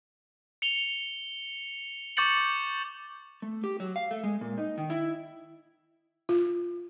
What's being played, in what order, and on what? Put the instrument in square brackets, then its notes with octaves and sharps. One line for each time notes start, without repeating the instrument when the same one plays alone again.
[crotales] C#7 F7 G7
C#6 D6 G6 A6 C#7 F#7
[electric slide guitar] A3
G4
F#3
F5
A3
G#3
A#2
D#4
D#3
E4
[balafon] F4